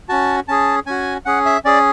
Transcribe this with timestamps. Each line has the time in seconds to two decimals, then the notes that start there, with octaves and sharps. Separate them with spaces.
0.09 C#4 F#4 A5
0.48 C#4 G#4 A5
0.86 C#4 F#4 G#5
1.25 C#4 G#4 F#5
1.45 E5
1.65 C#4 G#4 D5